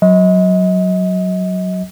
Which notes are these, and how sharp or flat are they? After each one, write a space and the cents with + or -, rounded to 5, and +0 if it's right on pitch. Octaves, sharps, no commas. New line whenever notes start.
F#3 +0 D#5 +35